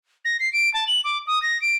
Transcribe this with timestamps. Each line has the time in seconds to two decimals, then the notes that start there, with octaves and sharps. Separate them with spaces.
0.25 A#6
0.40 C7
0.53 D7
0.74 A5
0.87 F#7
1.04 D6
1.27 D#6
1.42 A#6
1.62 D7